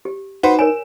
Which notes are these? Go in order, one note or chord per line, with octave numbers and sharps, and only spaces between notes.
G4
D#4 F#4 B4 C5
A#4 C#5 G#5 E7